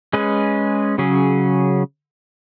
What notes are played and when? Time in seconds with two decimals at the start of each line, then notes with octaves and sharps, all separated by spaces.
0.13 G#3 C#4 G#4 B4
0.98 C#3 F#3 C#4 G#4